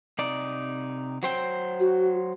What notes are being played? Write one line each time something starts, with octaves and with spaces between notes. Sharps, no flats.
C3 D#4 D5
F#3 C5 G5
F#4